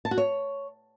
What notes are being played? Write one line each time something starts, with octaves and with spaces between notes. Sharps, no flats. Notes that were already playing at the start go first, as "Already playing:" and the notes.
A5
F#4
C#5